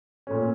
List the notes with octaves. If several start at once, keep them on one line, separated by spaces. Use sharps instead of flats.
A#2 A3 C#4